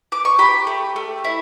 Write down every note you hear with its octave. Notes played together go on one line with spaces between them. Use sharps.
D6
C#6
G4 B5
A3
A3
E4